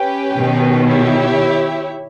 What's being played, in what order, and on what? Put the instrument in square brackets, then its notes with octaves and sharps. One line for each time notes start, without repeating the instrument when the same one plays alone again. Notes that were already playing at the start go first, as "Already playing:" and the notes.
Already playing: [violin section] C#4 G4 B4 G5
[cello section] B2 D#3
[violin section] E4 G4 C#5 E5